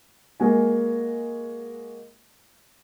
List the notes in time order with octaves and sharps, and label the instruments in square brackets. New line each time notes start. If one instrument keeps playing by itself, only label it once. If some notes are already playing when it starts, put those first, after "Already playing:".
[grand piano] G#3 A#3 F#4 G#5